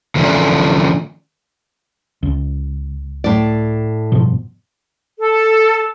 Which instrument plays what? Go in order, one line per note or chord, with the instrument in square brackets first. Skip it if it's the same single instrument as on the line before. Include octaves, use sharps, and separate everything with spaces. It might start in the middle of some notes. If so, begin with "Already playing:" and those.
[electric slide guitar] D3 E3 F3 A3 C#4 D4
[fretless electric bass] C#2
[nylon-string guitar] A2 D5
[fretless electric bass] G2 B2 F3
[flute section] A4